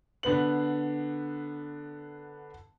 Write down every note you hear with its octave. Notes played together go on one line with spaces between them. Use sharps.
D3 B3 B4 F#7